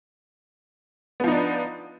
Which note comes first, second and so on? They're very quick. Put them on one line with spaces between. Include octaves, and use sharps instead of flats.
B3 F3 D#4 D4